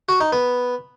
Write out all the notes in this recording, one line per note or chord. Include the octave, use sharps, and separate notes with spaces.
F#4
D#4
B3